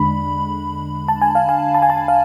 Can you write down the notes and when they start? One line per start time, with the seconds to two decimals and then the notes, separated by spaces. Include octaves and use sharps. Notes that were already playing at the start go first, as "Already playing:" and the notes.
Already playing: E2 D3 G#3 D4 B5
1.08 A5
1.22 G#5
1.35 F5
1.49 G#5
1.75 A5
1.82 G#5
1.90 A5
2.08 F5